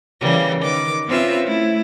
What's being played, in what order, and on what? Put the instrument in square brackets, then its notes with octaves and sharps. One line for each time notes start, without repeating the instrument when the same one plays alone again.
[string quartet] C#3 E3 G3 A#3
D#3 B4 D6
C4 C#4 F4 B4 E5
A3 E4